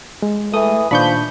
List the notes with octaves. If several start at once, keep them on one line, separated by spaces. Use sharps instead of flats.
G#3
E3 A3 D#6
A#2 D#3 F3 D4 B5 C#6 G6